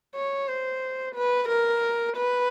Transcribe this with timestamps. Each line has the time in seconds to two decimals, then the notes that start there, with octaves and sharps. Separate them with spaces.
0.15 C#5
0.48 C5
1.15 B4
1.49 A#4
2.17 B4